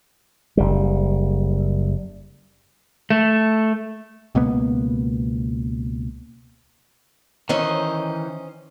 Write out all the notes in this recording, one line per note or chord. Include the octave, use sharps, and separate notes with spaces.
F#1 G3
A3
C#2 B2 A#3 B3
D#3 E3 C#4 C5 D#5